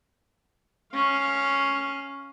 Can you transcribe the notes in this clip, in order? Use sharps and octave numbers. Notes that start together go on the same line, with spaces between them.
C#4 F5